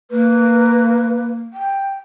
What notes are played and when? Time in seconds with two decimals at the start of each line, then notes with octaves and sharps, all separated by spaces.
0.11 A#3 B4
1.53 G5